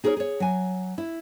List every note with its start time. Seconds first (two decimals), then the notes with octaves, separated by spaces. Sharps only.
0.04 D#4 G#4 A#4 B4 C#5
0.17 G#4 C#5
0.40 F#3 G#5
0.98 E4